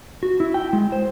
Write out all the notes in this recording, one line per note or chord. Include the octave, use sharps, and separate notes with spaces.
F#4
E4
G5
G#3
C5